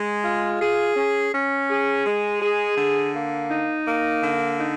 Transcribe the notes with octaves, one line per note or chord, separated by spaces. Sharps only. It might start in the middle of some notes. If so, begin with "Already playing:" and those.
Already playing: G#3
F4
G#4
C#4
C#4
G#4
G#3
G#4
D3
A#3
D#4
A#3
D3
D#4